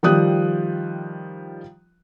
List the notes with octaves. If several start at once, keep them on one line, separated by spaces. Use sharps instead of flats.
D#3 F3 G3 D#6 F#6